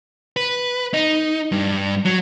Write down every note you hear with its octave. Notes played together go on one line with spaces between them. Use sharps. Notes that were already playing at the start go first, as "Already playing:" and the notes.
B4
D#4
G2
F#3